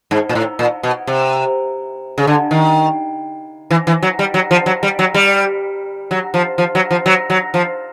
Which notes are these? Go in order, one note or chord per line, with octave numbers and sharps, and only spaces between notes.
G#2
A#2
A2
A#2
B2
C3
C#3
D3
D#3
E3
E3
F#3
G3
F#3
F3
F#3
G3
F#3
G3
F#3
F3
F3
F#3
F3
F#3
F#3
F3